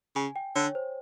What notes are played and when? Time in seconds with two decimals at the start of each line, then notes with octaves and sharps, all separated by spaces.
0.16 C#3 G#5
0.36 G5
0.55 D3 C#5
0.75 C5